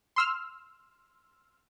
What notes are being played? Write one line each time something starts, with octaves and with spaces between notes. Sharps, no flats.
C6 E6 F6